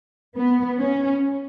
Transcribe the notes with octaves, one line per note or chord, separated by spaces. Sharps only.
B3
C#4